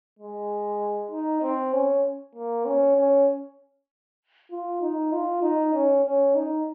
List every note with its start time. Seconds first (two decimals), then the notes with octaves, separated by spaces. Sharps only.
0.19 G#3
1.11 D#4
1.42 C4
1.73 C#4
2.35 A#3
2.65 C#4
2.97 C#4
4.51 F4
4.82 D#4
5.13 F4
5.42 D#4
5.74 C#4
6.05 C#4
6.35 D#4